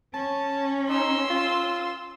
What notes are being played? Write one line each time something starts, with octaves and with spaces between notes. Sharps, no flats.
C#4 A5
D#4 C6 E6
F4